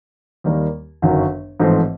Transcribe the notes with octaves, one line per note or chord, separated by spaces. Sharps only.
D#2 D#3 G3 A#3
G1 F#2 D#3 F#3
A1 G#2 F3 A3 C4